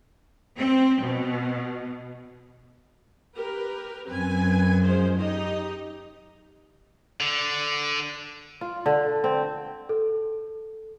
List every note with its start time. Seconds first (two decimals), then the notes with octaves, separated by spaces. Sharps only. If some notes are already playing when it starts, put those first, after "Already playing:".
0.58 C4
1.03 B2
3.36 G4 A#4 B4
4.10 F#2 C4 B4 G#5
4.82 F3 G#3 C5
5.19 D#4 G4 D#5
7.21 D3
8.61 F4
8.86 D3
9.24 C4
9.89 A4